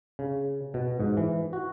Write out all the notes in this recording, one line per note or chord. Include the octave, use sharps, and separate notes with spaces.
C#3
B2
G#2
E3
F#4